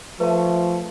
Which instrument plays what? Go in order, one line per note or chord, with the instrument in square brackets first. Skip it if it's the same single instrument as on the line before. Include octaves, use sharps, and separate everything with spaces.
[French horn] F3 [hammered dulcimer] A3 [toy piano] B4 A5